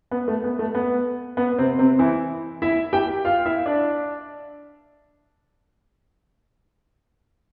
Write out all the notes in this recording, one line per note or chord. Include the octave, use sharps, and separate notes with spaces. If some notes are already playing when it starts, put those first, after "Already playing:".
B3
A3
B3
A3
B3
B3
C3 C4
C3 C4
E3 E4
E4 E5
G4 G5
F4 F5
E4 E5
D4 D5